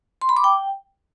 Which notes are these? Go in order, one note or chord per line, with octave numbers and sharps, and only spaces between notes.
C6
B5
D6
G5